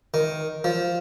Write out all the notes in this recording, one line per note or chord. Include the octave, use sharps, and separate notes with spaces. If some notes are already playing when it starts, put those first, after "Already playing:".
D#3
F3